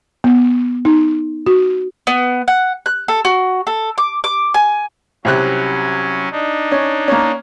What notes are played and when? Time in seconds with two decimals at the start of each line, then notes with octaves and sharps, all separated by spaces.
0.24 B3
0.85 D#4
1.46 F#4
2.07 B3
2.48 F#5
2.86 F#6
3.08 A4
3.25 F#4
3.67 A4
3.98 D6
4.24 D6
4.54 G#5
5.25 C2 C3 F#3 C#4 F#6
6.31 D4 D#4
6.72 C#4
7.08 A#3 C#4